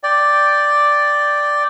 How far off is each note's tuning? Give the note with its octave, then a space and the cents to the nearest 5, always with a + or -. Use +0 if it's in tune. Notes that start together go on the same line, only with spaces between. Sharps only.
D5 +0 G5 +0